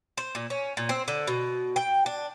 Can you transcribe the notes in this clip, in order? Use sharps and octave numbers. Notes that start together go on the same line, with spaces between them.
C5
A#2
C#4
A#2
C4
D3
B2
G5
D4